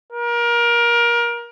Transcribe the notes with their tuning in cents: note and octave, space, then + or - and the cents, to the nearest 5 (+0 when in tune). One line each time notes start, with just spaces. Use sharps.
A#4 +25